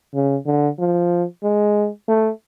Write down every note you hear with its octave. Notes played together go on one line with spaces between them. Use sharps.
C#3
D3
F3
G#3
A3